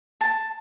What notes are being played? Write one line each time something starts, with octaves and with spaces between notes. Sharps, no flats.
A5